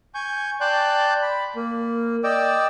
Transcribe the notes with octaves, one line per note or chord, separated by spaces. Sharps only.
G#5 C#6 G6
D5 G5 A5 C6 F#6 G6
B5
A#3
D5 D#5 G5 D6 E6